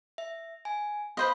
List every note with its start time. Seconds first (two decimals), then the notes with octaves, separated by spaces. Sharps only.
0.18 E5
0.65 G#5
1.17 B4 C5 D#5 F5